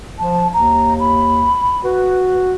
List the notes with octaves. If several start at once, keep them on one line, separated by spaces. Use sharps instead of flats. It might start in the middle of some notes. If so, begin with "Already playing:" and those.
F3 A5
D#2 A#5
B5
F#4 B4